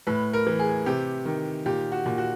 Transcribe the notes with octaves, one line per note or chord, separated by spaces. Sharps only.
A2 B4
A#4
E3
G#4
C3 G4
D#3
A#2 G4
F#4
A#2
F#4